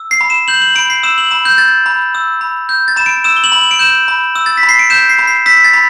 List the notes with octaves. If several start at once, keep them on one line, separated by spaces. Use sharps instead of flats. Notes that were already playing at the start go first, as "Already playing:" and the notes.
Already playing: E6
C7
B5
E7
G6 F#7
F#7
B5 D7
C7
E6 E7
F#7
B5 E7
G6
G6 A6
B5
E6
B5
G6
A6
B5 E7
D7
E6 E7
G7
F#7
B5
F#7
D7
G6 E7
B5
E6
A6
B6
B5
C7
D7
G6 E7
C7
B5
C7
E6 B6
A6
B5